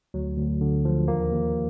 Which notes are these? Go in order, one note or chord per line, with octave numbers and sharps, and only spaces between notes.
D2 F#3
D2
D3
F3
D#2 A#3
D#2